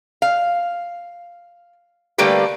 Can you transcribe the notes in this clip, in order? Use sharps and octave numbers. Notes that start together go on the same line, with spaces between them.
F5
D3 G3 A3 A#3 G4 B4